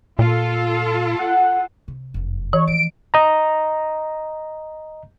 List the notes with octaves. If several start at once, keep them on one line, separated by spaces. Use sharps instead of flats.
A#2 F4 A4
F#5
C3
F1 F#2
E3 C#5
F3 A3 D7
D#5 A#5